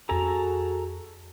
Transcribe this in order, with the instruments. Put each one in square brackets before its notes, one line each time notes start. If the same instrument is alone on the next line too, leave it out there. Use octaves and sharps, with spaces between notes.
[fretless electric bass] F2 C#4 [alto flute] F#4 [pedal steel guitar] G#4 A4 A#5